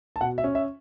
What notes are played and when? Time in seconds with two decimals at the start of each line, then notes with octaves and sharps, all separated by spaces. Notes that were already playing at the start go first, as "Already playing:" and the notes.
0.16 A5
0.21 B2 F#5
0.38 E5
0.44 C#4
0.55 E5